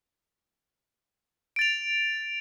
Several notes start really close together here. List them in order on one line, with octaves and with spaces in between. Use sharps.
D7 A6 F7